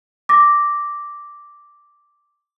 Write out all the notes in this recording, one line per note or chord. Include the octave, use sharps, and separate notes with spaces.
D6 A#6